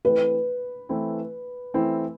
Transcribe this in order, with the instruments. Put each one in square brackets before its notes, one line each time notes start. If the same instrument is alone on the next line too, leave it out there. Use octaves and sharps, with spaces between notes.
[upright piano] E3 A3 C4 E4 [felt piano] B4
[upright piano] E3 A3 C4 E4
E3 A3 C4 E4